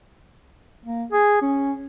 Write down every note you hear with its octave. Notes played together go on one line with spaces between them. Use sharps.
A#3
G#4
C#4